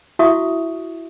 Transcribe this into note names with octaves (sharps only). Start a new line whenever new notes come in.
E4 F#4 E5 C#6 D#6